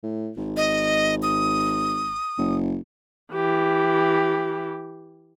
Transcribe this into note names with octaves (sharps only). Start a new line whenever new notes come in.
A2
G#1
D#5
D#6
F#1
E3 G4